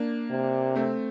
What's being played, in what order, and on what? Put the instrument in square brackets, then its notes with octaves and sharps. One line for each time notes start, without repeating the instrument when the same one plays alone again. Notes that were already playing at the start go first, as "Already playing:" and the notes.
Already playing: [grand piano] A#3 D4
[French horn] C3
[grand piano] A3 C4